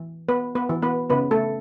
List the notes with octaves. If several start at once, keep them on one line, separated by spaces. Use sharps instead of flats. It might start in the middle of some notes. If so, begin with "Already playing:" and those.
Already playing: E3
B3 B4
B3 B4
E3
B3 B4
C#3 B3 B4
A3 A4